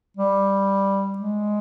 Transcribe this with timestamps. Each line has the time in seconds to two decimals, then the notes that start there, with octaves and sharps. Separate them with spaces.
0.17 G3
1.18 G#3